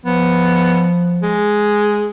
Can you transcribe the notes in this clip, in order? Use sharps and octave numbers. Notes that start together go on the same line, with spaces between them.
F3 B3
G#3